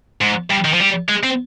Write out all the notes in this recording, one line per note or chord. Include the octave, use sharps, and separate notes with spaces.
G#2
G2
D#3
F3
G3
G#3
C4